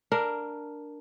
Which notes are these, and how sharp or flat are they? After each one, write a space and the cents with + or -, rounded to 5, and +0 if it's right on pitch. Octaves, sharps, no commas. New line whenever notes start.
D4 +0 A#4 +0 F5 -20